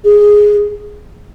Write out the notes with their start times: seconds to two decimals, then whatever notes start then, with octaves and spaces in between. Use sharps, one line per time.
0.04 G#4